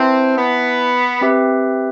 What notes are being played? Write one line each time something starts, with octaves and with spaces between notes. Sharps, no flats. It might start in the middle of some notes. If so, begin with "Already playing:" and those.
Already playing: C4 E4 B4 E5 A5
B3
C4 G4 B4 E5